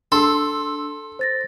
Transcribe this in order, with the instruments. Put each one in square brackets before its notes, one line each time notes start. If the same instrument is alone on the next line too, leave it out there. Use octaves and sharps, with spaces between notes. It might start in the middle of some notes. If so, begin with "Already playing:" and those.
[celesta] D4 E6 [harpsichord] A4 [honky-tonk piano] C6
[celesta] C5 A6 A#6